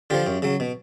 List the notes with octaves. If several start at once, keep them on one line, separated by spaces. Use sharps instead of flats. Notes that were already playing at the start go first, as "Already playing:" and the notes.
D3 F3 F4 G4
F#2
C#3 F#3
B2